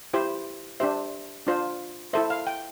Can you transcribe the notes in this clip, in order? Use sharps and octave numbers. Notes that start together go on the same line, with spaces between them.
E4 G4 C5
D4 G4 C5 E5
D4 F4 C5
E4 A4 C5 E5
F5
G5